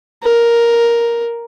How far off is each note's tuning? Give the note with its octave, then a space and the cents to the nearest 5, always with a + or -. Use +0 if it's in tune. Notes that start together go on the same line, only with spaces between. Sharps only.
A#4 +5